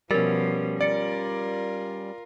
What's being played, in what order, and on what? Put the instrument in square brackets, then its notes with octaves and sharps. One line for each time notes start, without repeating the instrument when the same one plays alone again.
[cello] B2 F3 [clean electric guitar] G3 C#4 [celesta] A#4 A6
[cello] F4 A#4 [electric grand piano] D5 [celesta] A6 C#7